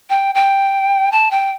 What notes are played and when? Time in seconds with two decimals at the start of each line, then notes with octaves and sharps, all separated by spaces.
0.10 G5
0.35 G5
1.12 A5
1.31 G5